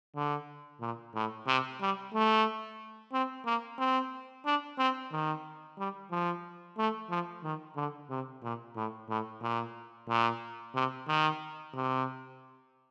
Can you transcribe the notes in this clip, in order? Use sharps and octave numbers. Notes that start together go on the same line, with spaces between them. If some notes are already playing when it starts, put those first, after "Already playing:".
D3
A#2
A2
C3
G3
A3
C4
A#3
C4
D4
C4
D#3
G3
F3
A3
F3
D#3
D3
C3
A#2
A2
A2
A#2
A#2
C3
D#3
C3